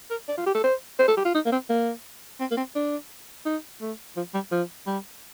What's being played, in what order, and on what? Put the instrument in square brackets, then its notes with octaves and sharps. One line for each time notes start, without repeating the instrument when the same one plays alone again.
[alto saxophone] A#4
D5
F4
G4
A4
C5
C5
A4
G4
F4
D#4
A#3
C4
A#3
C4
A#3
C4
D4
D#4
A3
F3
G3
F3
G3